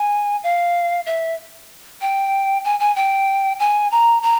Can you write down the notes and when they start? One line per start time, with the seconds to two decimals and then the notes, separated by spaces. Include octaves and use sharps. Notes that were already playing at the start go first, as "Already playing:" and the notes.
Already playing: G#5
0.43 F5
1.06 E5
2.01 G5
2.65 G#5
2.80 G#5
2.96 G5
3.60 G#5
3.92 A#5
4.23 A#5